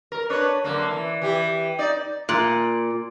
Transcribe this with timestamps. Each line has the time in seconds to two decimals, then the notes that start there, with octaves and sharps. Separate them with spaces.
0.12 A#4
0.30 D4 B4 C#5
0.64 F#2 D3 A#3
0.91 E3
1.22 E3 G4
1.79 D#4 D5
2.29 A#2